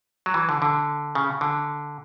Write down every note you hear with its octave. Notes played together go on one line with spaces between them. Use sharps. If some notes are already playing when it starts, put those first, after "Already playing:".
F#3
E3
D3
D3
C#3
D3